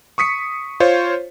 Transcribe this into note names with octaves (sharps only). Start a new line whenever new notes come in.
C#6 D#6 B6 C#7
F4 C5 C#5